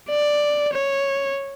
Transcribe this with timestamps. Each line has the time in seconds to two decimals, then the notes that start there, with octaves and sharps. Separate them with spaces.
0.10 D5
0.72 C#5